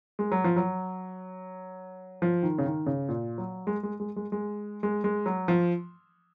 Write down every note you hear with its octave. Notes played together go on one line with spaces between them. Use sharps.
G#3
F#3
F3
F#3
F3
D#3
C#3
D#3
C#3
A#2
F#3
G#3
G#3
G#3
G#3
G#3
G#3
G#3
F#3
F3